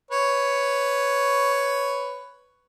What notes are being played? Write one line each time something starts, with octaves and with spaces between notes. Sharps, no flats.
B4 C#5